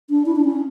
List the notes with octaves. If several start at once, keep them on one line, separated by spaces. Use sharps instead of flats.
D4
E4
D4
C#4